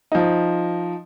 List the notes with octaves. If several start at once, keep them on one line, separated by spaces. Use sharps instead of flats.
F3 D#4